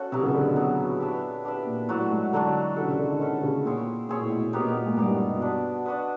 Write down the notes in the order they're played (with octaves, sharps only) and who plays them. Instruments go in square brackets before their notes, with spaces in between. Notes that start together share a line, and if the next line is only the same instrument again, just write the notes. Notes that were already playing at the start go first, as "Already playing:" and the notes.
Already playing: [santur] C#4 F#4 A4
[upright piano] C3 [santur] F#3 B3 E4
[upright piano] C#3
D3
B2
[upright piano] B2 [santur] F#3 B3 E4
[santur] D4 G4 B4 E5
D4 G4 B4 E5
[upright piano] A#2
[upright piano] A2 [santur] F#3 A3 D4 F#4
[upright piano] G#2
[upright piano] D3 [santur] F#3 A3 D4 F#4
[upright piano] D3 [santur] C#4 E4 A4
[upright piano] C#3
D3
D#3
[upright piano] D3 [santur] C#4 E4 A4
[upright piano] C#3
[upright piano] A#2 [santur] C4 E4 G#4 C#5
[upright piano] A#2 [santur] C4 E4 G#4 C#5
[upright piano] A2
B2
A#2
[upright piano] B2 [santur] B3 D#4 G4 A#4
[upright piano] A#2
A#2
G#2
[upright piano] G2 [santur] B3 D#4 G4 A#4
[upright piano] G2
B2
[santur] D4 F#4 B4 D#5
D4 F#4 B4 D#5